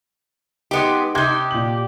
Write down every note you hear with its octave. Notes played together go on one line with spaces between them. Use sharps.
G#3 B3 D#4 G4
C3 D#4 G4 C6 G6 G#6
A#2 F#7